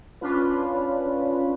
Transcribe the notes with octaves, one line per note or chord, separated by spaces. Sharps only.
C#4 D4 F4 B4